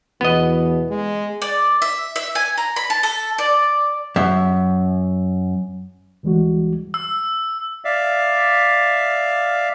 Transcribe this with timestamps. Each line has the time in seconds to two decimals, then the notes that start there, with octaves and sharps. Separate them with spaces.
0.21 E2 B2 B3 D#5
0.90 G#3
1.42 D5
1.82 E5
2.16 E5
2.35 G#5
2.58 A#5
2.76 B5
2.90 A5
3.03 A4
3.38 D5
4.16 F#2 E5
6.23 D2 E3 G3 G#3 F#4
6.94 E6
7.85 D5 E5 F5